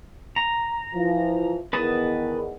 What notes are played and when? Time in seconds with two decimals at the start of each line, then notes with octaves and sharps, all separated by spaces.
0.36 A#5
0.94 E3 F3
1.73 E2 D#3 B4 A5 D#6